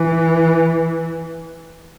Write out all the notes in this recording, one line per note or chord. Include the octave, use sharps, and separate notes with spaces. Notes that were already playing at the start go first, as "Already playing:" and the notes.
Already playing: E3